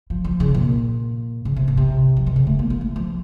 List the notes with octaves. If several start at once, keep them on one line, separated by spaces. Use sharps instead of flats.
F3
F3
C#3
A#2
C#3
C3
A#2
C3
F3
D#3
C#3
A3
A#3
A#3
A3
F3